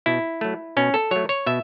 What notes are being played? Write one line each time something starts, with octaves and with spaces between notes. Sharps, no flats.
B2 E4
F#3 A3
B2 C#4
A4
F#3 A3 C#5
C#5
B2 E5